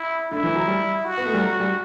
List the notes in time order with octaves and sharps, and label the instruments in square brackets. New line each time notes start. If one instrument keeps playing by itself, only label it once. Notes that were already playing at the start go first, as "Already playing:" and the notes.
Already playing: [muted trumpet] E4
[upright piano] D3 [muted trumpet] E4
[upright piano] E3
F#3
G3
[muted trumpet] F#4
[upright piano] B3
A3
G3
F#3
G3